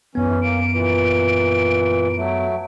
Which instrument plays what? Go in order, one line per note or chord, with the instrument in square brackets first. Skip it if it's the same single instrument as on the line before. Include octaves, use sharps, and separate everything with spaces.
[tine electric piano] F#2 B3 [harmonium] E3 C#4
[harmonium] A#3 [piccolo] D7
[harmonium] A#2 E3
F#3 A3